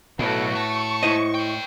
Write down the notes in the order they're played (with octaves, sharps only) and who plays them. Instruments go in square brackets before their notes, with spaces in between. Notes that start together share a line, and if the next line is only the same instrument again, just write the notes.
[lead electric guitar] B1 [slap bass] A2 [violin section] B3 F#4 A4
[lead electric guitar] A3 A4 [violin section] C#6
[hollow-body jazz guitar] E4 C5 D#5
[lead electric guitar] B4 G5